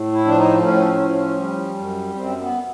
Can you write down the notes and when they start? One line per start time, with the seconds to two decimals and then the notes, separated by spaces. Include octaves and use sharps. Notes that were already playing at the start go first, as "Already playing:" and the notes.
Already playing: A2
0.12 E4
0.25 F3 D4
0.38 D#4
0.63 A2 C#4
1.01 F3
1.39 G3
1.77 F#2
2.15 F#2 C4
2.41 B3